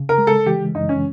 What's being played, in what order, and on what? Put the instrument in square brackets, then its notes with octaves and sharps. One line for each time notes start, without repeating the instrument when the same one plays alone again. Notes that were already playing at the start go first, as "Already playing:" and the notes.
Already playing: [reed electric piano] C#3
[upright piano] A#4
[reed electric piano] G#3
[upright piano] A4
[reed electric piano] E3 [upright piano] G4
[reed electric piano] F#2 [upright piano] D#4
[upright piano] C#4